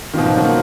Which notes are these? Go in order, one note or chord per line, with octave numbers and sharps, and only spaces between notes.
B2 D#3 A#3 F4
F3
F#3
A#3